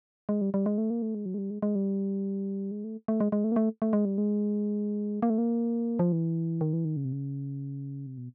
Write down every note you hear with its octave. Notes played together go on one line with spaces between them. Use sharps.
G#3
G3
G3
G#3
A3
A#3
A3
G#3
F#3
G#3
G3
G#3
G#3
G3
G#3
A3
A3
G#3
G#3
A3
A#3
A3
A3
G#3
G3
G#3
A#3
A3
A#3
F3
E3
D#3
E3
D#3
C#3
C3
C#3
C3
B2